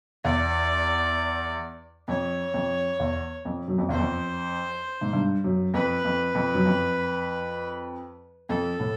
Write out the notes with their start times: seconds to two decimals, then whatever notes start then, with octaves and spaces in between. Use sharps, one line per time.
0.24 E2 D5
2.08 F2 C#5
2.54 F2
3.00 E2
3.45 F2
3.68 F#2
3.78 F2
3.89 E2 C5
3.99 F2
5.01 G#2
5.13 G2
5.44 F#2
5.74 F2 B4
6.05 F2
6.35 F2
6.54 F#2
6.66 F2
8.49 F2 A4
8.79 A2